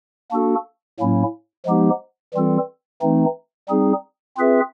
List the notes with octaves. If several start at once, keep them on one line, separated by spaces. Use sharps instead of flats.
A#3 D4 F#4 A4
A2 F#3 A#3 C#4 E4
F3 G#3 B3 D#4 G4
E3 G3 C4 F4 A4
E3 A3 C4 D#4
G3 C4 D#4 G#4
C4 F4 G#4 B4 E5